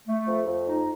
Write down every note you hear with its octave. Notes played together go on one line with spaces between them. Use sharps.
A3
F2
F2
D#4